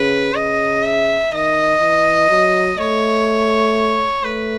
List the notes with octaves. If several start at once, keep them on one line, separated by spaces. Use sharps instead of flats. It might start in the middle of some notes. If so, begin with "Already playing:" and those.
Already playing: C#3 B4
C#3 D#5
E5
D#3 D#5
E3
F#3
A3 C#5
A3 B4